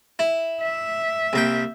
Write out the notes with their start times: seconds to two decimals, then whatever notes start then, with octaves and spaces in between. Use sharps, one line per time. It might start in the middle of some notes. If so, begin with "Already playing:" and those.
0.19 E4
0.63 E5
1.33 C2 A#3 G5